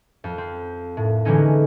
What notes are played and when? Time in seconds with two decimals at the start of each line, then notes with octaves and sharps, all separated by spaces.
0.24 F2
0.38 C4
0.97 A2
1.25 D3 E3 G#3 B3 C#4 D#4